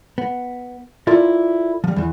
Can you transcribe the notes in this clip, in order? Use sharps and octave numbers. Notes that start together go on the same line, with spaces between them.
B3
E4 F4 A4 A#4 D5
F3 G3
E2 E3